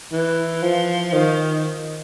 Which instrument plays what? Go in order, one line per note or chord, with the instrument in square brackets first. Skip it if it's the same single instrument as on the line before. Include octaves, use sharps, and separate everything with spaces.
[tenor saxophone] E3
F3
D#3